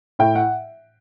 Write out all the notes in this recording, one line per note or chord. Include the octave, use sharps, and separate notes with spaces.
A2 G5
F#5